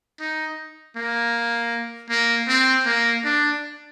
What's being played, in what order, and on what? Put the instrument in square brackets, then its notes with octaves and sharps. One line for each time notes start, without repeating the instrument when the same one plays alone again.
[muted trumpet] D#4
A#3
A#3
C4
A#3
D4